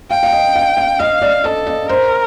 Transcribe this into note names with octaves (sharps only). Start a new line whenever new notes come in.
F5 G5
F5
D#5
F5
F5
D#5 F5
D5
A4 D#5
D#5
A#4 C5